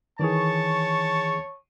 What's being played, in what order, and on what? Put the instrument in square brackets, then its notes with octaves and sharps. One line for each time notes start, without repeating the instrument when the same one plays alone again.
[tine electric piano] D#3 E3 G#4 [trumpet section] C#5 A5 C#6